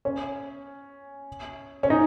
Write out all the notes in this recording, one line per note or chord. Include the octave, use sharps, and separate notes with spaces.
C#4
C#4
D#4